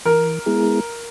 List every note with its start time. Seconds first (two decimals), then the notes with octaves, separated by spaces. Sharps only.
0.05 E3 A#4
0.46 G#3 B3 E4 G#4